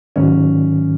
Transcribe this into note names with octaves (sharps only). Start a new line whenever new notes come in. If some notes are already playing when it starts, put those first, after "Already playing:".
G#2 D#3 F#3 C#4